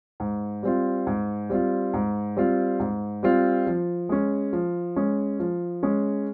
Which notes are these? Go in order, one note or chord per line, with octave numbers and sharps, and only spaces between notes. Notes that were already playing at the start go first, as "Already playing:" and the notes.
G#2
G3 C4 F4
G#2
G3 C4 F4
G#2
G3 C4 F4
G#2
G3 C4 F4
F3
G#3 C#4
F3
G#3 C#4
F3
G#3 C#4